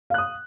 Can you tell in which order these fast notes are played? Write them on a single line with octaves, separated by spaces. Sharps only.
F5 F#6 D#6